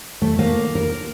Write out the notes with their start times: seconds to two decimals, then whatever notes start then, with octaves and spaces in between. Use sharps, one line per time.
0.22 A3
0.39 A#3
0.75 A#4